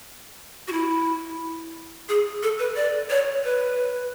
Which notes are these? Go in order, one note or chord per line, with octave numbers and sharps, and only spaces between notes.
F#4
E4
G#4
A4
B4
D5
C#5
B4